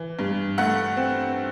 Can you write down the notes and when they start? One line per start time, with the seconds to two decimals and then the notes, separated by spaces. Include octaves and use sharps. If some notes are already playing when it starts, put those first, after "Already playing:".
Already playing: E3
0.19 G2
0.58 A3 F#5
0.97 C4